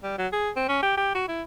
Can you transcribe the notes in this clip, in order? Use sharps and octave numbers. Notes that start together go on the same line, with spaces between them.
G3
F#3
G#4
C4
C#4
G4
G4
F#4
E4